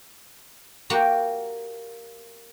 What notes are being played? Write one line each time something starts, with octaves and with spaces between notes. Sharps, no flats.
A#3 F#4 G4 F#5 A#5